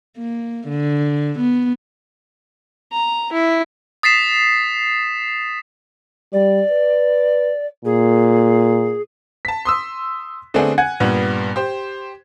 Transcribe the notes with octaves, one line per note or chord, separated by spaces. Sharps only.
A#3
D3
B3
A#5
E4
D#6 A6 B6 C7 E7
G3 D5
B4
A#2 G#4
A5 B6
C6 D#6 E6
D3 A3 B3 C4 D4 G#4
F#5 G#5 G#6
G2 A#2 G3 B3
G4 C5